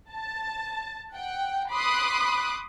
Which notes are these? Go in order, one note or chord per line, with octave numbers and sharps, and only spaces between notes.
A5
F#5 G5
B5 C6 D6 D#6 F#6